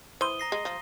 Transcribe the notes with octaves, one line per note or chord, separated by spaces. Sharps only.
E3 C5 D#6 D#7 G7
A#5 A#6 C7
G#3
F3